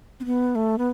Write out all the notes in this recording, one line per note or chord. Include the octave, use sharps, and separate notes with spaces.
C4
B3
A3
B3